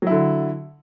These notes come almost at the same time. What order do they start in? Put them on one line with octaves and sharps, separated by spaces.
F#3 E4 D3